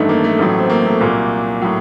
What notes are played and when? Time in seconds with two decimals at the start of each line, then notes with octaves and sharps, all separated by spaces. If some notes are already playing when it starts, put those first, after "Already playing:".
Already playing: A1 G2 D#3 A3 D#4
0.09 A#3
0.24 A3
0.39 A1 A2 F#3
0.59 C4
0.69 A#3
0.86 A3
1.00 C2 A#2 F#3 A#3
1.62 A2 F#3